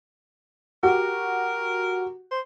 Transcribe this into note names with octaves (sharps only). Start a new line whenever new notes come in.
F#4 G4 A#4
C5